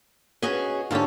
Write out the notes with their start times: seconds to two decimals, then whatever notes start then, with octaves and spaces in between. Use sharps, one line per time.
0.42 C#4 F#4 G#4 B4 D#5 G#5
0.91 G#2 D3 C#4 F4 G4